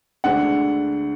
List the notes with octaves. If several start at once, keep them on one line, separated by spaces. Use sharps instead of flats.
D2 D3 G#3 D4 F#5